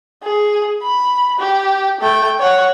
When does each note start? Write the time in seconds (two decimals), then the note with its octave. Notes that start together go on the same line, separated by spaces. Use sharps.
0.23 G#4
0.83 B5
1.39 G4
2.01 A3 G5
2.40 C#5 F#5